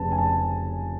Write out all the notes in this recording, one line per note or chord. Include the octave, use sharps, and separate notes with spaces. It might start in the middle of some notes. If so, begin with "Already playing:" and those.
Already playing: F1 F2 C#3 B4 A5
G#5
A5